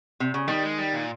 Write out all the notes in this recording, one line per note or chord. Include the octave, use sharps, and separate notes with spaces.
C3
C#3
D#3 G3
G#3
G3
A#2